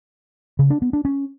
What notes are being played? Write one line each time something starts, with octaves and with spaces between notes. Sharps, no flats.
C#3
D4
B3
D4
C#4